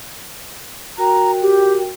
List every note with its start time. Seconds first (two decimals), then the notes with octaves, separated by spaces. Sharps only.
0.98 F#4 A#4 G5 A#5
1.42 G4